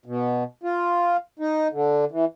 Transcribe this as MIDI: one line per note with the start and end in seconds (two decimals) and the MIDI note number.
0.06 0.43 47
0.63 1.17 65
1.39 1.68 63
1.72 2.05 50
2.11 2.25 52